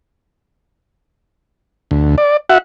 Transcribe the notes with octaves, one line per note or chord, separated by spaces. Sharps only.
D2
D5
F#4 E5 F#5